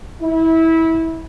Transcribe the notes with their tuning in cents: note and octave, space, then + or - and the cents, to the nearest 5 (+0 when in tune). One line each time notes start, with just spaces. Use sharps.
E4 -20